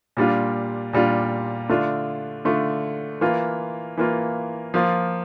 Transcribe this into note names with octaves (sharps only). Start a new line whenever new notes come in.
A#2 G3 D4 F4
A#2 G3 D4 F4
D3 A3 D4 F4
D3 A3 D4 F4
E3 A#3 F4
E3 A#3 F4
F3 A#3 F4